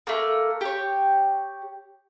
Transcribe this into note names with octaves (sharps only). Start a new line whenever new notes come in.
A3 A#3
G4 C#5